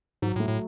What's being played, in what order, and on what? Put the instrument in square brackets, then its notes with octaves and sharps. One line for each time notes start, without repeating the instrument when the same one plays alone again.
[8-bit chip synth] G#2 [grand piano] F#3
[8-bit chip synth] A2
[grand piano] A3
[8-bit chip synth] A2